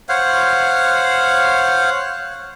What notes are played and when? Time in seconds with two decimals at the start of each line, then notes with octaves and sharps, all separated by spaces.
0.09 C5 C#5 F5 F#5